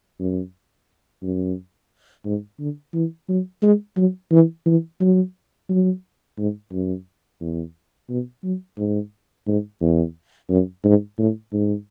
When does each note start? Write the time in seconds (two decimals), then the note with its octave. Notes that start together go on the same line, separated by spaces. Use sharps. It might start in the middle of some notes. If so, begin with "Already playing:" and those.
0.20 F#2
1.22 F#2
2.25 G#2
2.60 D3
2.94 E3
3.29 F#3
3.62 G#3
3.97 F#3
4.32 E3
4.66 E3
5.00 F#3
5.69 F#3
6.38 G#2
6.72 F#2
7.41 E2
8.09 B2
8.44 F#3
8.78 G#2
9.47 G#2
9.81 E2
10.50 F#2
10.84 G#2
11.18 A2
11.53 G#2